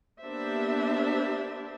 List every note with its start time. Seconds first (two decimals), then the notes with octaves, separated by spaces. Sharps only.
0.21 A#3 B3 D4 G4 C5 E5